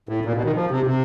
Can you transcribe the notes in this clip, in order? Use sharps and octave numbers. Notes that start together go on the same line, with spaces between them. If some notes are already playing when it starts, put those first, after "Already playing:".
A2
A#2
B2
D#3
F3
C3
C3